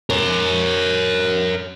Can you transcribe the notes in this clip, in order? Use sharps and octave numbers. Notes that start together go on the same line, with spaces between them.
A#4 C#5